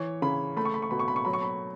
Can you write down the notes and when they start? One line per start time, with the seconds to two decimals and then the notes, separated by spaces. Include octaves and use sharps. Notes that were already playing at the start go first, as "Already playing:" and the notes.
Already playing: E3 C#5
0.22 C#3 B5
0.57 A3 B5
0.65 C#6
0.74 B5
0.82 C#6
0.91 B2 B5
0.99 C#6
1.08 B5
1.16 C#6
1.25 F#3 B5
1.33 C#6
1.42 B5